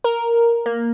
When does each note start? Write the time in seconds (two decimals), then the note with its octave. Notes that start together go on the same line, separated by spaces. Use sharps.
0.04 A#4
0.66 A#3